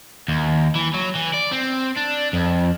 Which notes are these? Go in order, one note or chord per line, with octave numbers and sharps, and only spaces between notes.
D#2
E3
F#3
E3
D5
C4
D4
F2